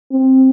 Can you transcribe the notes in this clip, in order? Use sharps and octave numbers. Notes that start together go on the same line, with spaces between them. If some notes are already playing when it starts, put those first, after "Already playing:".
C4